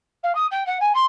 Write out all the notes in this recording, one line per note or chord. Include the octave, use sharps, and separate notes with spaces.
F5
D#6
G5
F#5
G#5
C6